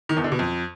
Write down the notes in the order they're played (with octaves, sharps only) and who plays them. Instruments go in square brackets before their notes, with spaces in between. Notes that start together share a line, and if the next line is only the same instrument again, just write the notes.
[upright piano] D#3
E2
D3
B2
F2